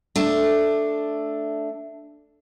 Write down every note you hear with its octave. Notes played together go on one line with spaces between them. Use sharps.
A3 D4